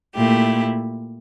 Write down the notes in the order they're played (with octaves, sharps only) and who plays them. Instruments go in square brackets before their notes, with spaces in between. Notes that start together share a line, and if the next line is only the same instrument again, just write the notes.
[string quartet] A#2 A3 E4 G4